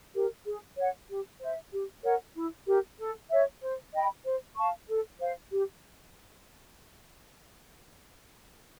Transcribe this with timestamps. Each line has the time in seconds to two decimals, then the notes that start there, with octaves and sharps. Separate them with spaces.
0.14 G4 A#4
0.46 G#4
0.77 C#5 F#5
1.09 G4
1.40 C5 E5
1.72 G4
2.03 A#4 C#5 F#5
2.35 E4
2.67 G4 A#4
2.98 A4
3.30 C#5 E5
3.61 C5
3.93 D#5 G5 B5
4.24 C5
4.56 F5 A5 C#6
4.88 A4
5.19 C5 F5
5.51 G4